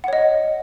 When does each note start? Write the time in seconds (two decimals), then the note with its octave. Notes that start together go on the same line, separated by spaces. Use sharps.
0.04 F#5
0.08 C#5
0.13 D#5